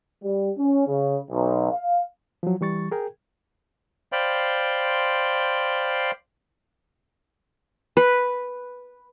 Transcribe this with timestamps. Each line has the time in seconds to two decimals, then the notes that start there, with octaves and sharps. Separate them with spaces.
0.23 G3
0.57 C#4
0.88 C#3
1.30 B1
1.72 F5
2.43 F3 F#3
2.61 E3 G3 C#6 A6
2.91 G#4 A#4 G5
4.12 C5 D5 F5 G5 B5 C6
7.97 B4